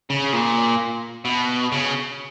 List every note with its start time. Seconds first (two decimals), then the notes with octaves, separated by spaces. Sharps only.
0.10 C#3
0.33 A#2
1.25 B2
1.72 C#3